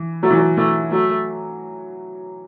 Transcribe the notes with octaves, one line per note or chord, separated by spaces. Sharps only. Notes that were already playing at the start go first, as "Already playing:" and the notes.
Already playing: E3
F#3 A3
E3
F#3
E3 A3
F#3 A3